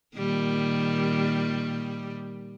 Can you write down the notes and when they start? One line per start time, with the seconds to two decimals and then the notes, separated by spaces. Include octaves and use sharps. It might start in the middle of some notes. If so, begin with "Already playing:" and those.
0.17 A#2 D#3 G3